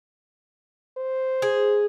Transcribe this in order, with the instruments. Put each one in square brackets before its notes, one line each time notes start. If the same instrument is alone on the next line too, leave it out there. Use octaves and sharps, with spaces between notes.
[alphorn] C5
[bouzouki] G#4